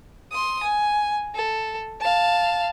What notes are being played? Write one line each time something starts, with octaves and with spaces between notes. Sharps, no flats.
C6 D#6
G#5
A4
F5 A5